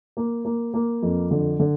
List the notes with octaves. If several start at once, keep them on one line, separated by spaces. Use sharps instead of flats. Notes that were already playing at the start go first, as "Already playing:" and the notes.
A#3
A#3
A#3
F2
D3
D3